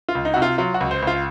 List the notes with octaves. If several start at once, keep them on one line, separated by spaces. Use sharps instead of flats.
F4
C#2
D#4
C3 F#4
F4
F#3 F4
F#4
C#2
C5
C#2
F4